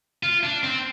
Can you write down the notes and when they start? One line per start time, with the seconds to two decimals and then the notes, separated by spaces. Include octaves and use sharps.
0.23 F4
0.43 D4
0.63 C4